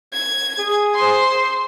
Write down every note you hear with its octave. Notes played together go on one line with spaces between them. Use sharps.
G#6
G#4
C5 C6